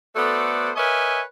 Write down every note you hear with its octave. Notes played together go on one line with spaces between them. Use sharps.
A3 B3 F#4 A4 C5 D5
A#4 B4 C#5 D#5 E5 G#5